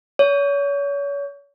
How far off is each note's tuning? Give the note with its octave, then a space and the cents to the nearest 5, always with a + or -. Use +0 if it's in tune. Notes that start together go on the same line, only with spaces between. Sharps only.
C#5 +35